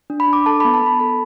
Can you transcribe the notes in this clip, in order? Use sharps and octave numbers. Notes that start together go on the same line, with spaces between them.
D4
B5
D4 D6
A4 A5
B5
B3
A5
B3 B5
A4 A5